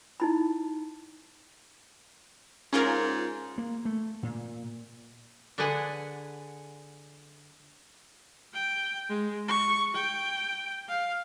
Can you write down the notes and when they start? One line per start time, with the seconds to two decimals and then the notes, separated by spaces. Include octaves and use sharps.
0.20 D#4 E4 B5
2.73 G#2 C#4 F4 A#4
3.58 A#3
3.85 A3
4.23 A#2
5.58 D3 D4 G#4 B4 F#5 G#5
8.53 G5
9.08 G#3
9.48 C#6
9.94 G5
10.88 F5